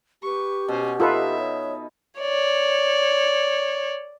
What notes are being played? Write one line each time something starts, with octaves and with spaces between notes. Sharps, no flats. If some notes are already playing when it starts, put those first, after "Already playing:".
G4 B4 C#6
B2 C#4 C5
D#4 F4 A4 B4 E5 B5
C#5
C#5 D5